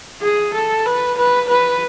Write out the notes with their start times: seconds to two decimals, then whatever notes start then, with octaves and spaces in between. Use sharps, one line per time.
0.22 G#4
0.54 A4
0.86 B4
1.17 B4
1.49 B4